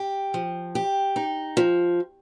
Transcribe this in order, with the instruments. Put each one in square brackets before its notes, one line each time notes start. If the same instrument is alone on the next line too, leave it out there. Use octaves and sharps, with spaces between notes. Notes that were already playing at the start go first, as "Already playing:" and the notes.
Already playing: [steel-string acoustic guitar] G4
F3
G4
D#4
F3